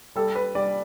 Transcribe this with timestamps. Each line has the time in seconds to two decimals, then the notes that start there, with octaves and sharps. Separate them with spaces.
0.16 G3 A4
0.35 B4
0.55 G3 D5